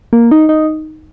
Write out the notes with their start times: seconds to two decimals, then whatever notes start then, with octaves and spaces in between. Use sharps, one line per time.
0.13 A#3
0.31 D#4
0.49 D#4